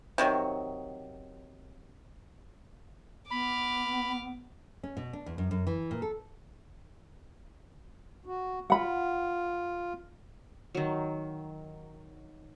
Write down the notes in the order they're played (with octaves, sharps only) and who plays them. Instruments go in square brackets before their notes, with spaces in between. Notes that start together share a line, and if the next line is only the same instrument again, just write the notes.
[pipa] C3 D#3 F#3
[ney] B3 [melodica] B5 [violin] D6 F6
[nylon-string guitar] C#4
B2
D4
E2
F#2
F#2
E3
A#2
A4
[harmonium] F#4
[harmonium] F4 [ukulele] F#5 B5
[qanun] D#3 F#3